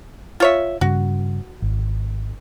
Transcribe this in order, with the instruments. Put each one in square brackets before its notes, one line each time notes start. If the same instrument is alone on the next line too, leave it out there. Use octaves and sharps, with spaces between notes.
[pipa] F4 C#5 E5
[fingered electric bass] G2 C#3 [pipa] F#4
[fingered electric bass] G#1